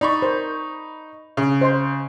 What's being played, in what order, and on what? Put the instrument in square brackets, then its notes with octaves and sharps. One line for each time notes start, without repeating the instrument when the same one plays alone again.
[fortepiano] D#4 B5 C#6 [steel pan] D5
[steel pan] A#4 C5
[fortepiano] C#3
[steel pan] C5 D#5 C6